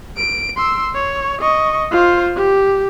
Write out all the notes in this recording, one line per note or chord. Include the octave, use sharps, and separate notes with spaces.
D7
C6 E6
C#5
D#5 C#6
F4 C5
G4